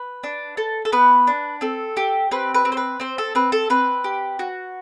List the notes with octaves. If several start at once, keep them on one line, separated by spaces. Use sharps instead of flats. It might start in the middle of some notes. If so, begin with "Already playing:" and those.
Already playing: B4
D4
A4
A4
B3 B4
D4
C4 A4
G4
C4 B4
B4
C4
C5
B4
C4 C5
A4
C4 B4
A4
C4 B4
G4
F#4